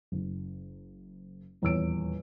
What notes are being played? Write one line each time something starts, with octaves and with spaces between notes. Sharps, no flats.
F#1
D#1 E2 C#5 E6 D7